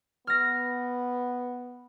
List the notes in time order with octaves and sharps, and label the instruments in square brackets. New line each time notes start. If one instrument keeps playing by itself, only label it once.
[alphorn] B3 [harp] F6 A#6